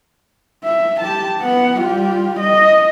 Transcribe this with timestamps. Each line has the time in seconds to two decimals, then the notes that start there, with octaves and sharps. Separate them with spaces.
0.64 E5
1.00 G4 A5
1.40 B3 F#5
1.77 G3 F4
2.40 D#5